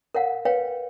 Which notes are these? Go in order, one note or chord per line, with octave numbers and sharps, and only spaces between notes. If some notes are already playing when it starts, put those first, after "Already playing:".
A#4 C#5 F5 F#5
B4 C#5 F5 G5